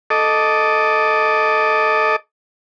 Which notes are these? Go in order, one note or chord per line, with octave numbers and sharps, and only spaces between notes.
A4 D#5 D6